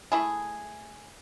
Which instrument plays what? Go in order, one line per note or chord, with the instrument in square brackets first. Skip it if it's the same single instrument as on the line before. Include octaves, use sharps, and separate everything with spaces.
[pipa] A3 E4 G#4